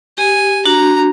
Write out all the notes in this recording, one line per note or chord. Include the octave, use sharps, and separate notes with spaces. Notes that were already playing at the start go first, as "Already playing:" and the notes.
G4 G#5
D4 F#4 A#5